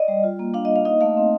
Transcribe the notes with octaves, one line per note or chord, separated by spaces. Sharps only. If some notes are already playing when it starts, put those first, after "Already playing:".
Already playing: D5 D#5
G3
F4
A#3
D4 F5
D#5
A#3
F5
D#4 D#5
A3 F5
C4